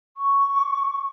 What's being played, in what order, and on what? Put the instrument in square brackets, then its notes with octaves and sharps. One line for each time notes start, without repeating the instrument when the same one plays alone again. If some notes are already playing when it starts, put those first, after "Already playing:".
[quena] C#6